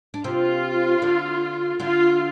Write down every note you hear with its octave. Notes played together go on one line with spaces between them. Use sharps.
D4
C3 C4 F4
D3 D4
D3 D4 F4